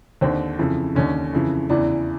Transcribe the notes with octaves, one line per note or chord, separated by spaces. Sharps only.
D#2 D3 C4
F2 C#3 E3
D#2 D3 C#4
F2 C#3 E3
E2 C#3 E3 D4